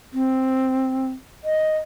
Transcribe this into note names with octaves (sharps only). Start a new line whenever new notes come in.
C4
D#5